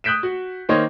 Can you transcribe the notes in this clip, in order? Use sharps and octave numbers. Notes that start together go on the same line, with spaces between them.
D#6 F#6 G6 B6 D7 E7
F#4
D#3 A#3 C5 C#5 D#5